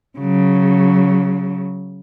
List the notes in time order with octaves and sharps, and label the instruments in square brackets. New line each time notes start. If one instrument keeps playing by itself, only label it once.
[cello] C#3 F#3